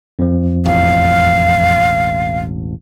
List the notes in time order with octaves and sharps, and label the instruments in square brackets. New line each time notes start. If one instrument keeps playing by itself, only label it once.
[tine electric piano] F2 F3
[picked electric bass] E1 A1 [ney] F5